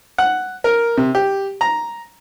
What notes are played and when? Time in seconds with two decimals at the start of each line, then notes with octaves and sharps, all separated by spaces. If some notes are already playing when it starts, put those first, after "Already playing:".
0.18 F#5
0.64 A#4
0.97 C3
1.15 G4
1.61 A#5